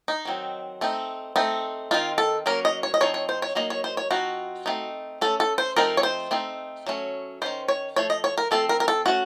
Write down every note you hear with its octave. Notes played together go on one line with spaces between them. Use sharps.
D#4
D#3 F#3 C4
A3 C4 D#4
A3 C4 D#4
D#3 F#3 C4 D#4 F4
A4
F#3 A#3 C#4 A#4
D#5
C#5
D#5
F3 C4 D#4 C#5
C#5
C5
C#5
F#3 A#3 D#4 D#5
C#5
C5
C#5
F3 C4 D#4 F#4
A3 C4 D#4
A3 C#4 A4
A4
C5
F3 A3 C4 D#4 A#4
C#5
C5
A3 C4 D#4
F#3 A3 C#4
D#3 A3 C#4 C5
C#5
F3 A3 C#5
D#5
C#5
A#4
F3 A3 C4 A4
A#4
A#4
A4
A3 C#4 F#4